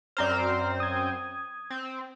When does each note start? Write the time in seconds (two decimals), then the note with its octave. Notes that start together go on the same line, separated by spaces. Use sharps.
0.17 F#2 C4 C5 D5 A#5 F6
0.80 D#6 G#6
1.70 C4